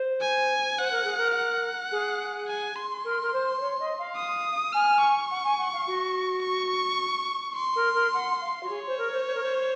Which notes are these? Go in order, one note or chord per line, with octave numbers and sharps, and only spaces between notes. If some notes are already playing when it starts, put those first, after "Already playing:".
Already playing: C5
G#5
C5 F#5
A#4
G#4
A#4
F#5
G#4
G#5
C6
A#4
A#4
C5
C5
C#5
D#5
F5
D#6
G#5 F6
C#6
F#5
G#5
F#5
F5
F#4
C#6
C6
A#4
A#4
F#5
F5
F#4
G#4 C#5
C5
A#4
C5
C5
A#4
C5